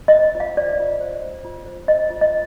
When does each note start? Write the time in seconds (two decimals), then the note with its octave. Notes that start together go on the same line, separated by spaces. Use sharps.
0.08 D#5
0.13 C5
0.35 F4
0.40 F5
0.57 C5 D5
0.80 F4
1.01 C5
1.23 C5
1.45 F4
1.66 C5
1.88 C5 D#5
2.10 F4
2.21 D#5